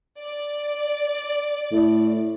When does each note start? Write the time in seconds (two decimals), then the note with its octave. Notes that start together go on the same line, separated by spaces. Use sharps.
0.20 D5
1.72 A2